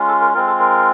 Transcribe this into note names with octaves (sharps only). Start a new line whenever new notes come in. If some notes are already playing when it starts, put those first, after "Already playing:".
Already playing: G#3 C#4 F4
A4
A#4
G#3 C4 F4 A#4
A4
A#4